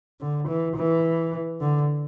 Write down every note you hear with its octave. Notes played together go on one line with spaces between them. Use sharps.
D3
E3
E3
D3